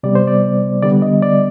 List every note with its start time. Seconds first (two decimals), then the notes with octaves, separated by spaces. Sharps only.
0.03 C3 G3 B3 D5
0.15 C5
0.27 D5
0.82 D3 G3 B3 D5
1.02 D#5
1.22 D5